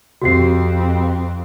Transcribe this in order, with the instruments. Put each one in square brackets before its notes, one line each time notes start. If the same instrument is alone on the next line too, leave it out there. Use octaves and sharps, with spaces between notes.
[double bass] F2 C4 [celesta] F#4 G4 C7